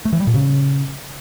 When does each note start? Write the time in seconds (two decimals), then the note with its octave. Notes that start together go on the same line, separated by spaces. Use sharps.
0.05 A3
0.13 E3
0.20 G3
0.27 A#2
0.34 C#3